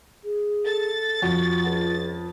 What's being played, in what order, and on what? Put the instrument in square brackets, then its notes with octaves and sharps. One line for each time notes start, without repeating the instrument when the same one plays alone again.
[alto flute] G#4
[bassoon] A4 [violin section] A6
[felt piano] F2 [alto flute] F4 [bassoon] F#4
[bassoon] C#2